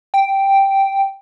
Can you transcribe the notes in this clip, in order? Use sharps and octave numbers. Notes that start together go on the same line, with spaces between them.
G5